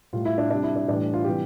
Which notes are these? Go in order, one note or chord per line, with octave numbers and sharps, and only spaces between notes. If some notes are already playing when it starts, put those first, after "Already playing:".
A2 G3 F4
E4
D4
C3 G3 D4
E4
D4
A2 E3 G3 D4
F4
C3 E3 G3 G4